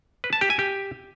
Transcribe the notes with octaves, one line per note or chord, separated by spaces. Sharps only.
B4
A5
G4
G#5
G4